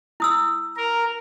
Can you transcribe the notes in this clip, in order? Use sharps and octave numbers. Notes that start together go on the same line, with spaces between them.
E4 D#6 E6
A#4